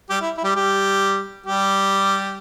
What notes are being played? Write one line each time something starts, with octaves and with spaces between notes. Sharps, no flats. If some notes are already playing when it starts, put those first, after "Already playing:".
G3 G4
E4
E4
G3 G4
G3 G4
G3 G4